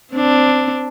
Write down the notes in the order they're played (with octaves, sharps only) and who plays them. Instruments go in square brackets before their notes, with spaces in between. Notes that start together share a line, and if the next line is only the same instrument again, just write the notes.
[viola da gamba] C4 D4